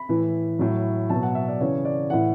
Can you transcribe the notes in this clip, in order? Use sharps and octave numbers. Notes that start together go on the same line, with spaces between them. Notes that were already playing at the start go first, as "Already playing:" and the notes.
Already playing: B5
A2 E3
A2 F#3
B2 F#3 A5
F#5
E5
D5
C#3 E3 C#5
D5
A2 E3 F#5